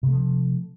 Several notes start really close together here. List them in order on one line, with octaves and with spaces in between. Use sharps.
C3 A3 F3